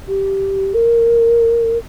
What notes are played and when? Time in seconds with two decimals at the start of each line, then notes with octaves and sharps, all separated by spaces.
0.07 G4
0.74 A#4